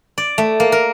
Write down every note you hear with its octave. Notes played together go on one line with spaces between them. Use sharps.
D5
A3
A#3
A#4